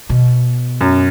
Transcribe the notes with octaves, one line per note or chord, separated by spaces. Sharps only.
B2
F#2